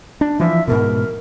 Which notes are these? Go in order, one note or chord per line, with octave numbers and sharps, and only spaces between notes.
D4
E3 F3 E5
G#2 B2 A#4